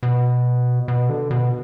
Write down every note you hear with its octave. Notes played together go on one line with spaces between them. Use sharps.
B2
B2
D3
B2